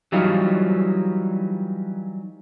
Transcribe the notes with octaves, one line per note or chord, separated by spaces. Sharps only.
E3 F#3 G3 D#4 F4